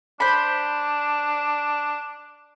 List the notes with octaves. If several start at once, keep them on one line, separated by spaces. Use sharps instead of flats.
D4 C5 B5